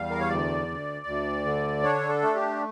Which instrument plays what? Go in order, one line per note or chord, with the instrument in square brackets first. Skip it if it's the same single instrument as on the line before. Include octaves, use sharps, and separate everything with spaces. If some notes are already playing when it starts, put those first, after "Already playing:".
Already playing: [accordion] E2 G3 F5
A#4
C#5
D2 D5
D2
D2
D3
D4 C#5
A4
A3
G4